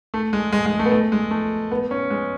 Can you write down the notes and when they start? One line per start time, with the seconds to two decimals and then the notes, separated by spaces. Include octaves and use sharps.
0.14 A3
0.33 G#3
0.52 G#3
0.66 G#3
0.79 A3
0.85 B3
0.92 A3
1.12 G#3
1.31 A3
1.71 B3
1.91 C#4
2.10 G#3